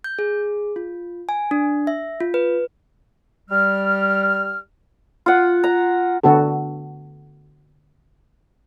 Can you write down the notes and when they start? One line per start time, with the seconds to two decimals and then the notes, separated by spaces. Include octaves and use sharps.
0.04 G6
0.19 G#4
0.76 F4
1.29 G#5
1.51 D4
1.87 E5
2.20 F4
2.34 B4
3.49 G3 F6
5.26 F4 F#5
5.64 A#5
6.23 D3 B3 F#4 A4